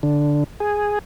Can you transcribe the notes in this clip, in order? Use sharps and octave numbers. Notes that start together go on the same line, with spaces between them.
D3
G#4